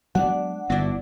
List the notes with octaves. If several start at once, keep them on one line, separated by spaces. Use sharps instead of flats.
F#3 G#3 B3 D4 F#5
G1 B3 D4 E4 F#4